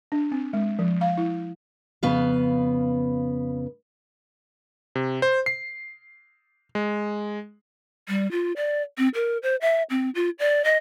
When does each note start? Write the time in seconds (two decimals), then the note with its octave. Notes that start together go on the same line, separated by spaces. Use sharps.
0.12 D4
0.32 C4
0.53 G#3
0.79 F3
1.01 F5
1.17 E4
2.03 F2 C#3 B3 B4 F5
4.95 C3
5.22 C5
5.46 C7
6.75 G#3
8.08 G3
8.31 F4
8.56 D5
8.98 C4
9.15 A#4
9.43 C5
9.61 E5
9.90 C4
10.15 F4
10.39 D5
10.65 D#5